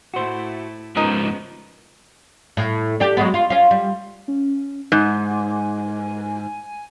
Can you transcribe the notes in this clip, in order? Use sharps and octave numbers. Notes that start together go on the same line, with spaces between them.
A2 A3 E4 F#4 C5
G#2 F3 G#3 B3 C#4 D#4 A#4
A2
D4 G4
F#3 G#3 B3
F4
C#4 F4
G3
C#4
G#2 G#5